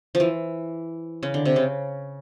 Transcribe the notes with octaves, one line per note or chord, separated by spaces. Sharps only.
F3
E3
C#3
D3
C3
C#3